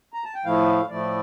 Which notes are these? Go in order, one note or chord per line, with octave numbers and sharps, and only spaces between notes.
A#5
A5
G5
A2 F3 A3 E4 F5
A2 F3 A3 E4 D5